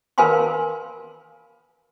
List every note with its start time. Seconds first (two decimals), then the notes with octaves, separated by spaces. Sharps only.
0.18 A#4 B4 F5 G#5 B5 C6